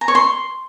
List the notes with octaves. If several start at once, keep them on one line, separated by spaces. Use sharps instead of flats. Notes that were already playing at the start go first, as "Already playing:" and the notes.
A#5
C#5
C6